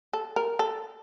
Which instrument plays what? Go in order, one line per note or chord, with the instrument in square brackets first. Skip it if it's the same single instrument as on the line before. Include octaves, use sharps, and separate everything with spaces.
[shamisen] A4
A#4
A4